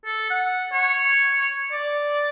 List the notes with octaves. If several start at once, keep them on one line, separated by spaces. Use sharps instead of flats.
A4
F#5
C#5
D5